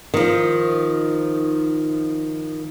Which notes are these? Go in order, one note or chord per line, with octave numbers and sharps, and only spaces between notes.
D#3 F3